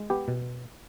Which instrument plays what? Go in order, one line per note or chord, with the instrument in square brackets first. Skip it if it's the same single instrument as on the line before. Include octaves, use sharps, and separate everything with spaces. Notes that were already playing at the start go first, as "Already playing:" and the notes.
Already playing: [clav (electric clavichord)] G#3
B3 G4
B2